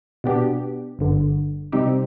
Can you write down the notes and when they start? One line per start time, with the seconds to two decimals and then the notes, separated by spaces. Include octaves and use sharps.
0.24 B2 B3 D4 G4
0.99 G1 G2 D3
1.72 C3 G3 C4 D#4 G4